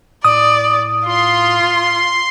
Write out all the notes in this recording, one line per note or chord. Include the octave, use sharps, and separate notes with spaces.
A2 D5 D#6
F4 C6